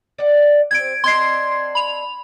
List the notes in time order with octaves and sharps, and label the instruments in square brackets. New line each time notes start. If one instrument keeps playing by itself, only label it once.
[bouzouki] D5 F#5
[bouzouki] C4 G4 C5 [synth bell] G#6 D7
[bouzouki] C4 D4 D#5 [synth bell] C6 G#6 C7
[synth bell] B5 F7